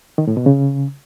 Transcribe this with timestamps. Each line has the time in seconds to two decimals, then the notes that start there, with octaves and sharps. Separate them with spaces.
0.18 D#3
0.27 A2
0.37 B2
0.46 C#3